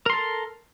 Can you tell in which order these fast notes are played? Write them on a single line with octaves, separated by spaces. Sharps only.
A#4 C6 A4